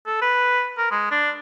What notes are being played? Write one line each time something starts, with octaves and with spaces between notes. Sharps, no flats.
A4
B4
A#4
G#3
D4